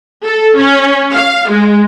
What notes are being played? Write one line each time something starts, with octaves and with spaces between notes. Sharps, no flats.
A4
C#4
F5
G#3